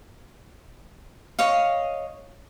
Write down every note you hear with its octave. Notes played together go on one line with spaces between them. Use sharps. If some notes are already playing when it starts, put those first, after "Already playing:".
C#5 D#5 F5